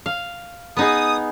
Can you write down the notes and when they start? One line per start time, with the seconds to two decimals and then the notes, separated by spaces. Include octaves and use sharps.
0.06 F5
0.77 B3 D#4 G#4 D#6